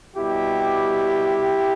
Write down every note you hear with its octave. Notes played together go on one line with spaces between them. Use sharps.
B2 G3 E4 G4